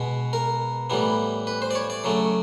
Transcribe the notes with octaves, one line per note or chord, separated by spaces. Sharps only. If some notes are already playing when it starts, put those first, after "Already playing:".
Already playing: B2 G#3 B3
A#4
A2 E3 G3 B3
B4
C5
D5
C#5
D5
C#3 F#3 A3